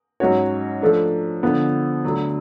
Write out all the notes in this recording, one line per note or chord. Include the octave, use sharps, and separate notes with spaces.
G#2 F#3 C#4 F#4 C#5
F3 A3 D4
D3 F3 B3
D2 D3 F#3